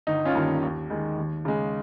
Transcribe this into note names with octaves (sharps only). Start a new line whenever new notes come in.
G1 D#4
C#4 F4
G2 D#3 A#3
D#2
D#3 G#3
D#2
C#3 G#3